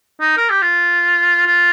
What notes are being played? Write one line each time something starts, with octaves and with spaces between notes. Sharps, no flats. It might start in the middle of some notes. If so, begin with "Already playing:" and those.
D#4
A#4
G4
F4
F4